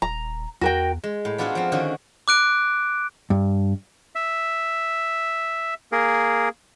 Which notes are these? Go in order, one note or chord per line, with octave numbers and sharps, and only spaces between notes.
D#1 A#5
E2 F#4 A#4 G5
G#3
A2
B3 D4 F4 F#4 G#4 A4
F3 C4
D3 D#3 C#4 F#4 G#4
D6 F#6 D7
G2
E5
A#3 G#4 A#4